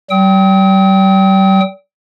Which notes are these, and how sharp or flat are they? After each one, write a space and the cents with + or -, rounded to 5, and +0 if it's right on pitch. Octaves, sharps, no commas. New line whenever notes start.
G3 -40 G5 -10 D#6 +45